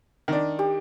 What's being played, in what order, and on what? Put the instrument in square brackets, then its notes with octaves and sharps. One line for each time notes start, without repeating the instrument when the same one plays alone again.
[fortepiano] D#3 D4
[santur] G4